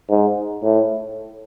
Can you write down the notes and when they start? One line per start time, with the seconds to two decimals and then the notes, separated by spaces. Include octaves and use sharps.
0.10 G#2
0.64 A2